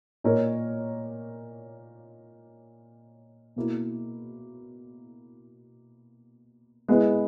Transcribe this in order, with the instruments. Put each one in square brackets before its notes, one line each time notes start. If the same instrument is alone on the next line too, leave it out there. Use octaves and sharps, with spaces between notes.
[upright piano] A#2 A#3 D#4 A#4 C#5
B2 A#3 E4
G#3 B3 E4